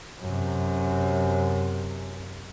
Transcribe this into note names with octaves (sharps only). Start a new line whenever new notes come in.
F#2 C3